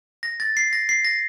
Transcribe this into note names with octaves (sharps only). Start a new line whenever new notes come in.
A#6
A6
C7
A#6
C7
A#6